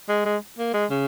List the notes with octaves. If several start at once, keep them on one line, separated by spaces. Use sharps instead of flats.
G#3
G#3
A#3
G#3
C#3